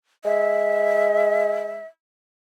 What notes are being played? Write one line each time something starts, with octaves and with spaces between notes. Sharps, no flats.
G#3 E5